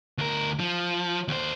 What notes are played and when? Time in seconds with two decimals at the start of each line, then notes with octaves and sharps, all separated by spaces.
0.18 D2 A#4
0.60 F3
1.28 D#2 C5